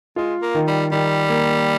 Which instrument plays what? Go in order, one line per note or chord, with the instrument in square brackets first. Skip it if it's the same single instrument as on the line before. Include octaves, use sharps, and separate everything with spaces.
[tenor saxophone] G#3 [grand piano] F4
[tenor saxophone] A#3
[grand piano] D#3
[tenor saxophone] G3
[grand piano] D#3 [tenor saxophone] G3
[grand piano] A#3